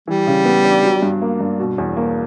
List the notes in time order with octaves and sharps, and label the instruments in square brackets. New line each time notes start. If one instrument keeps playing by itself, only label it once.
[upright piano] E3 [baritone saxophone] G3
[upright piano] C#3
B3
D4
F#3
G2
A#3
G2
B2
E2
A#3